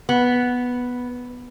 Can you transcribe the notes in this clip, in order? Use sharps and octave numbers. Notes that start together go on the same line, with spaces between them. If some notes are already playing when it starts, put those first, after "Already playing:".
B3